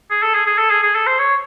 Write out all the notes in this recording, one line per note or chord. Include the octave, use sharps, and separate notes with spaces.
G#4
A4
G#4
G#4
A4
G#4
G#4
A4
C5
C#5